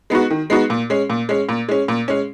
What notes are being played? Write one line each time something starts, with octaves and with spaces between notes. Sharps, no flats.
G#3 B3 D#4 F#4
D#3
G#3 B3 D#4 F#4
A#2
G#3 C#4
A#2
G#3 C#4
A#2
G#3 C#4
A#2
G#3 C#4